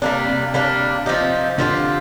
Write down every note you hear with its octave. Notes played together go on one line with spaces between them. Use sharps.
C3 G3 A#3 D4
C3
G3 A#3 D4
F3 C4 D#4 G4
D3 F3 C4 D#4 G4